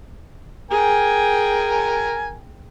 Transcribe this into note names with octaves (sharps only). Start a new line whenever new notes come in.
G#4 A#4 G5 G#5